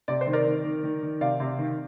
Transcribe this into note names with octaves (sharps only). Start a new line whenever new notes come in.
C3 D5
C5
D#3
A#4 D5
D#3
D#3
D#3
D#3
C3 D5 F5
C3
D#3